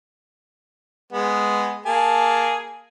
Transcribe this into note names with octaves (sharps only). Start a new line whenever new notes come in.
G#3 B3
A#3 G#4 A5